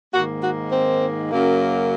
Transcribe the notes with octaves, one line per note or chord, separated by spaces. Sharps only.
G#2 D#3 A#3 F#4
F#4
C4
F#2 C#3 F#3 A#3